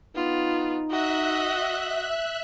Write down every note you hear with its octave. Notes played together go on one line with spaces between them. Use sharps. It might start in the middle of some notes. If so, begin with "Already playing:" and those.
B3 D#4 F4
F#4 D#5 E5 F#6